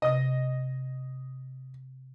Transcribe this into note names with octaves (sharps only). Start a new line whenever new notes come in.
C3 D#5 D#6